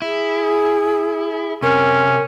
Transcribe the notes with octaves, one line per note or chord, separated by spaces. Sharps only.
E4 G#4
C3 C#4 A#4